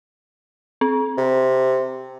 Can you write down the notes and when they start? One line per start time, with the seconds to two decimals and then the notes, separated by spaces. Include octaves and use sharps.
0.81 C4
1.18 C3